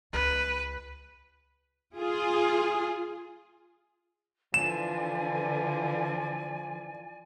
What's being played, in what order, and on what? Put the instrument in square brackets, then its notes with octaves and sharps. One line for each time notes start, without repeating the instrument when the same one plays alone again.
[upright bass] C#2 [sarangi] B4
[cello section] F4 G#4
[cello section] D3 E3 [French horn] F3 [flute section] D5 G#5 [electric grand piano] E7